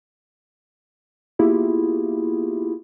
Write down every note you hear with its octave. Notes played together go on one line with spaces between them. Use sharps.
A#3 B3 E4 F4 G4 G#4